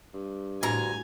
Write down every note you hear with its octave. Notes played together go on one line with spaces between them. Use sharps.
G2
D2 A2 G#5 A#5